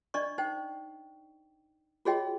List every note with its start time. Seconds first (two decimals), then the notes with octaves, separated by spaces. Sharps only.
0.14 D4 D5 D#5 C#6
0.38 D#4 C5 G5
2.05 F4 F#4 G#4 C#5 D#5 G5